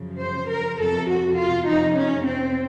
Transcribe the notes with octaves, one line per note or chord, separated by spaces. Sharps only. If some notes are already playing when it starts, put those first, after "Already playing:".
Already playing: F#2 C#3 F3
C5
A#4
F2 C3 F3 A4
F#4
F4
F2 C3 F3 D#4
C#4
C4